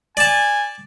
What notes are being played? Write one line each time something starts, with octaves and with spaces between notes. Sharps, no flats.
D5 G#5 A5